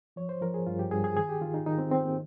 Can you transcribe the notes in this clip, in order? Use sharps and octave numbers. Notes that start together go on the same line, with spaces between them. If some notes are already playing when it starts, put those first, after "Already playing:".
F3 C#5
C5
F3 A#4
G#4
G2 F4
G4
G2 G#4
G#4
D#3 G#4
G4
D#3 F4
D#4
D#3 D#4
C4
D#3 C4
A#3